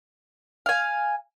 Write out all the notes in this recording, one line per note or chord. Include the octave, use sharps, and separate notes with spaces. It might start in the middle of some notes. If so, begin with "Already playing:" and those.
F5 G#5